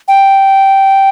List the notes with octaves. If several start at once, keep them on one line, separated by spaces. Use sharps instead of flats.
G5